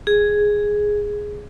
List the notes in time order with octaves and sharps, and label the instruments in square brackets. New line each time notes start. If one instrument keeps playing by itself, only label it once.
[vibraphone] G#4